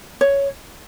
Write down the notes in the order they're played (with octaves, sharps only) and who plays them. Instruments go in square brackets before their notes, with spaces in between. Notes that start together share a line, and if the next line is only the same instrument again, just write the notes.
[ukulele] C#5